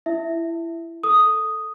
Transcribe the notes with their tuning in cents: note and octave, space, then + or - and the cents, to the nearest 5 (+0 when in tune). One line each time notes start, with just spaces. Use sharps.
E4 +20 E5 +0
A4 +0 D#6 +0